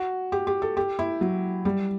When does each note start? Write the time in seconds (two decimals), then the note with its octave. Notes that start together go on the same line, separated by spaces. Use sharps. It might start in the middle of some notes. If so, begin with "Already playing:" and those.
Already playing: F#4
0.32 G4
0.47 G4
0.62 A4
0.77 G4
0.99 E4
1.21 F#3
1.65 G3